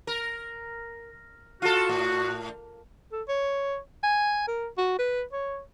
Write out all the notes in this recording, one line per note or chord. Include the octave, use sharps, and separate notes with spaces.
A#4
F4 F#4 A4
A2
A4
C#5
G#5
A#4
F#4
B4
C#5